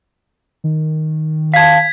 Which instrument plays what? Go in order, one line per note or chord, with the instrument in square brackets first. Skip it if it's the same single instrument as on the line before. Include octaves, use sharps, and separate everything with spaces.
[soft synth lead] D#3
[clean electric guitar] F5 A5 [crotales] G#6 B6